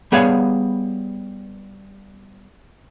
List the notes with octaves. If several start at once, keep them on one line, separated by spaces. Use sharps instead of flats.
G3 B3 G#4 C#5 F5 F#5